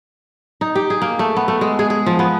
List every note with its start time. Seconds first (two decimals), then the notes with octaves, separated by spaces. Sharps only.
0.61 D#4
0.75 G4
0.90 G#4
1.02 A#3
1.19 A3
1.37 B3
1.48 A3
1.61 G#3
1.79 G#4
1.90 G#4
2.06 F3
2.19 B3